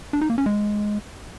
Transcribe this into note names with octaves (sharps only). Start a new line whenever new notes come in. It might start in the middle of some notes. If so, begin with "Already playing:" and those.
D4
D#4
A#3
C#4
G#3